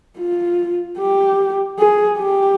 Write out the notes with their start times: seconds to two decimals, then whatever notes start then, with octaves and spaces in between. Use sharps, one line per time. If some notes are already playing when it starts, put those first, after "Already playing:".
0.18 F4
0.98 G4
1.78 G#4
2.18 G4